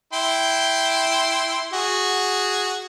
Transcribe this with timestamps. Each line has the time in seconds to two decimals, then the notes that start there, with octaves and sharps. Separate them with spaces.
0.13 E4 G5 C6
1.73 F#4 G#4